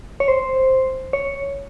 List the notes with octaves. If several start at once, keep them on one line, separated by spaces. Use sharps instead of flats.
C#5
C5
C#5